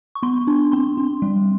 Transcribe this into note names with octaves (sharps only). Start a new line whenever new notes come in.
C#6
B3 C6
D4
C4 C6
C4
G3